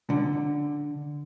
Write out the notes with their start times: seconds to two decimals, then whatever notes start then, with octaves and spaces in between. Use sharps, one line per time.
0.10 D3